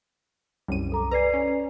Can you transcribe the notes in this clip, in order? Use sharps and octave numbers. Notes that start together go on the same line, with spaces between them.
C2 F#2 D#7
A4 A#5 D6
B4 D5 G#5 A#5 C7
C#4